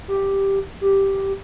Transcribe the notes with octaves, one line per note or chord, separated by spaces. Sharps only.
G4
G4